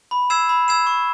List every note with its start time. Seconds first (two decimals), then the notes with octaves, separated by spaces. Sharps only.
0.11 B5
0.30 E6 G#6 C7 E7
0.49 B5
0.68 E6 G#6 C7 E7
0.87 C#6